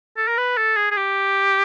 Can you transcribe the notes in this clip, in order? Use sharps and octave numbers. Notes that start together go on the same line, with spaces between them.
A4
A#4
B4
A4
G#4
G#4
G4